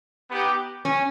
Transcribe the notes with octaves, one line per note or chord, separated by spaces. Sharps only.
B3 D#4 G4
C#4